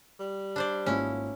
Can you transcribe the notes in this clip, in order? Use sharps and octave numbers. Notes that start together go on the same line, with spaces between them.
G3
D4 C5 D5
G#1 A#3 C#4 E4 F4